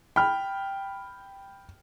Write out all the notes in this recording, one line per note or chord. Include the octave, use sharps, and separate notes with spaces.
G5 B5 F6